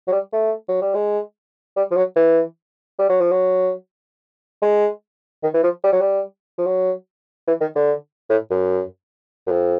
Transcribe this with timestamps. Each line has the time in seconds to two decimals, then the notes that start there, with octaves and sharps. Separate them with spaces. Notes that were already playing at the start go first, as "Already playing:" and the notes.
0.08 F#3
0.13 G3
0.33 A3
0.69 F#3
0.81 G3
0.95 G#3
1.77 G3
1.91 F3
1.96 F#3
2.16 E3
2.99 G3
3.09 F#3
3.21 F3
3.31 F#3
4.62 G#3
5.43 D#3
5.54 E3
5.64 F3
5.84 G3
5.93 F#3
6.01 G3
6.58 F3
6.67 F#3
7.48 E3
7.61 D#3
7.75 D3
8.30 A2
8.50 F#2
9.47 F#2
9.51 F2